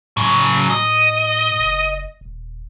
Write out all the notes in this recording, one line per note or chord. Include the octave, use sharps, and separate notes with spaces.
A2 C#3 F#3
D#5
F#1
D#1